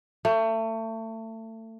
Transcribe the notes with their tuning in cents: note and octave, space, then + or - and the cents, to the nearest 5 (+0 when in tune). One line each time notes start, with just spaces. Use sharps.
A3 +30